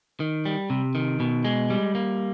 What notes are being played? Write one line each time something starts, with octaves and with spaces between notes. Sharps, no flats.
D#3
G3
C3
D#3
B2
G#3
G3
A#3